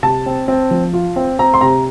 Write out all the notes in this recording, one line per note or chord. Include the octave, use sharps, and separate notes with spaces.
C3 A5
C4
C4
F3
F4
C4
C4 A#5
C6
C3 A#5